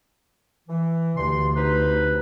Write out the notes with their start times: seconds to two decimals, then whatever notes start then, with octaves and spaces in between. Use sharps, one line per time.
0.68 E3
1.17 D2 G2 D5 C6
1.56 C3 D#4 B4